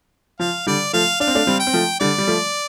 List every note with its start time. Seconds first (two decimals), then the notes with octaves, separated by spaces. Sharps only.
0.40 F3 F5
0.67 D3 G3 D5
0.93 F3 A3 F5
1.20 D4 F5
1.27 C4
1.35 A3 D4
1.47 G3 C4
1.60 G5
1.67 C4
1.74 F3 A3
2.00 D3 G3 D5
2.18 G3
2.27 F3 A3